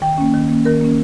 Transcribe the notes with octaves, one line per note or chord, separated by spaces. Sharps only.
D#3 G5
A#3 C#4
D#3
A#3 C#4
D#3 A#4
A#3 C#4